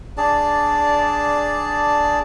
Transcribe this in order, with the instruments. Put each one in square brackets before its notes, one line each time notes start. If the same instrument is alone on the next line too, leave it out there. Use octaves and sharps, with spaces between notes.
[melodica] D4 G#4 D5 A5